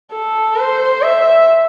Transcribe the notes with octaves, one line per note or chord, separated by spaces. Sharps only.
A4
C5
E5